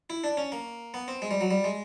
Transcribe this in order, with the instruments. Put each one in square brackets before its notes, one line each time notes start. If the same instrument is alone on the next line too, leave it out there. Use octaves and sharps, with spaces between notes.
[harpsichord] E4
D4
C#4
A#3
B3
C4
G#3
G3
F#3
G3
G#3